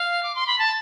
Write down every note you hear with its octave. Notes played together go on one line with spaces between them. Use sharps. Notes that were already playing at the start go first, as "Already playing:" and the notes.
Already playing: F5
D6
C6
B5
A5